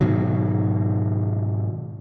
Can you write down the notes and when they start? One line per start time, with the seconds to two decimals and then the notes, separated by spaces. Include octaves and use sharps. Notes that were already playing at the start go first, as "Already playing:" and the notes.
0.01 G#2 B2 D#3 F#3